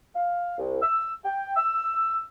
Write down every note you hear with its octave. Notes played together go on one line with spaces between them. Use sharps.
F5
C2
E6
G5
E6